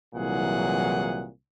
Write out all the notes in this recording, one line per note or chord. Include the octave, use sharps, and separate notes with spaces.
C2 A#2 E3 F#3 G#4 F#5